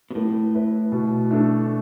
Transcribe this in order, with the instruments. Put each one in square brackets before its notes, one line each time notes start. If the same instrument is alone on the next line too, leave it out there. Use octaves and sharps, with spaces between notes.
[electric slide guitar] B2
[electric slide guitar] A2 [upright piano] B3
[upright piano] E4 B4
B2
A3 D4 A4